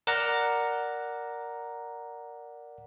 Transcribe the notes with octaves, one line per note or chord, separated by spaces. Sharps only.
A#4 D5 F#5 A#5